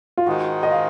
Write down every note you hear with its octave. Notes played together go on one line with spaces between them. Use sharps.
F4
G#2 D#3 G#3 D#4 F#4
D#5
F5